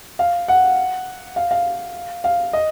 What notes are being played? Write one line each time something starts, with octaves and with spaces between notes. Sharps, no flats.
F5
F#5
F5
F5
F5
D#5